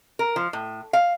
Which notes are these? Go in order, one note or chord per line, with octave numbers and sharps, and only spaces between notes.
A#4
F3
A2
F5